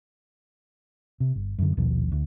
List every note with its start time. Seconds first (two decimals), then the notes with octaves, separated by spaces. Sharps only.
1.20 C3
1.36 G1
1.59 F#2 D3
1.77 A#1 D#2 B2 F3
2.12 D2